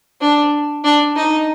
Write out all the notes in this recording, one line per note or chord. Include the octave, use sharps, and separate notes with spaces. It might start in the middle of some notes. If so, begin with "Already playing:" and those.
D4
D4
D#4